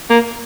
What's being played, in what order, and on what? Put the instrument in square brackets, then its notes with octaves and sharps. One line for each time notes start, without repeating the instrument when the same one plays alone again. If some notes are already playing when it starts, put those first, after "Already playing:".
[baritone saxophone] A#3